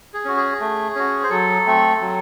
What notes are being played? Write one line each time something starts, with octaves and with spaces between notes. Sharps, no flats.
G#4
C#4 F#4
G#4
A3
C#4 F#4
C5
F#3 A4
A3 C4
F#3